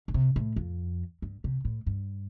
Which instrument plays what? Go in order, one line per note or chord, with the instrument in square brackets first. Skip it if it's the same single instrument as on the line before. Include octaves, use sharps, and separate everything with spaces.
[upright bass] D3
C3
A2
F2
G2
C3
A2
G2